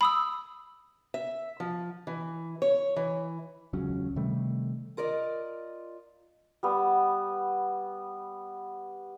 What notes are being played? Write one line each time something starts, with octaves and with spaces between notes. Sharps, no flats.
B5 D#6 E6
E5
F3
E3
C#5
E3
E1 C#2 F#3 C#4
C3 D#3 G3 A3
F4 A#4 D5 D#5
G3 B3